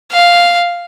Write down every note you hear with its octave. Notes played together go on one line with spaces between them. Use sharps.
F5